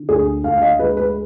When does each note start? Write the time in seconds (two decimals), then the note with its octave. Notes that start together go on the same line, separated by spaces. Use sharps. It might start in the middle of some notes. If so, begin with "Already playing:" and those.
Already playing: D3
0.09 D2 G#4
0.44 D2 F5
0.58 F5
0.62 D#5
0.79 G#3 B4
0.97 B4